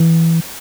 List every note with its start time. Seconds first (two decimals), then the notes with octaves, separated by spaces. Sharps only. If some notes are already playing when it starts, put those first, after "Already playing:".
Already playing: E3